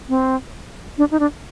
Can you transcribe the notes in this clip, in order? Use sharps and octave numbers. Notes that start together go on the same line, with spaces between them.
C4
D4
D#4
D4